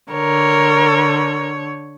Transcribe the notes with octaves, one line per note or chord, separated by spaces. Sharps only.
D3 A#4 C#5